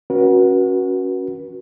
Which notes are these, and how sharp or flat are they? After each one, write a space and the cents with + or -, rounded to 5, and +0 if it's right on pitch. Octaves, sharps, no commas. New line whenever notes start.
C#4 +0 F#4 +0 B4 -45